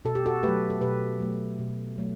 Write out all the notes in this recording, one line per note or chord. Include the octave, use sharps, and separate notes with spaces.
B2 A4
G4
F#4 A4
F#3 A3 G4 B4
A4
B2 G4 B4
F#3 A3
B2
F#3 A3